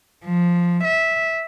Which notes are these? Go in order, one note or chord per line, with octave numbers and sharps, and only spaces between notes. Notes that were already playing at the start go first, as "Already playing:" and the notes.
F3
E5